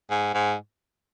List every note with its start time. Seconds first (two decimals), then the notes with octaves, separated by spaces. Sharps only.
0.10 G#2
0.34 G#2